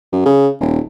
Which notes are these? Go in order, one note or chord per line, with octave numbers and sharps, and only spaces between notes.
F#2
C#3
D#1